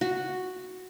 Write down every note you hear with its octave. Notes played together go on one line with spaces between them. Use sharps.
F#4